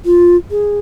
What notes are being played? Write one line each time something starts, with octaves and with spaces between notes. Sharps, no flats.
F4
G#4